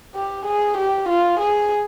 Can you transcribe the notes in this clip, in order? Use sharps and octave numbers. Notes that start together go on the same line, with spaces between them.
G4
G#4
G4
F4
G#4